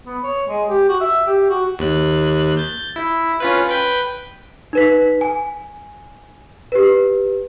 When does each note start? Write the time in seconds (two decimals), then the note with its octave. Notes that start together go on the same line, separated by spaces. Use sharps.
0.06 B3
0.24 C#5
0.49 G#3
0.69 G4
0.89 F#4
1.01 E5
1.27 G4
1.50 F#4
1.79 D#2 F#6
2.57 G6 A6
2.96 E4
3.40 C#4 F4 B4
3.70 B4 G5
4.73 D#4 B4 B6
5.21 G#5
6.72 G4 B4